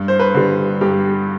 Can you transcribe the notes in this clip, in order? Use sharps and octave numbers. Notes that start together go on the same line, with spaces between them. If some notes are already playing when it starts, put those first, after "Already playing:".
Already playing: G2
C5
B4
D3 G3
G2 G4